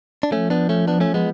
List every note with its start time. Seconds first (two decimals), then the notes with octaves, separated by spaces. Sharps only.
0.23 D4
0.32 F3 A3 C#4
0.50 B3 D4
0.69 A3 C#4
0.87 B3 D4
1.00 A3 C#4
1.14 G#3 B3